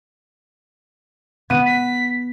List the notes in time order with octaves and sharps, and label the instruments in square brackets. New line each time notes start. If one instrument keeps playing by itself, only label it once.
[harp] B3 D#7
[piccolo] B6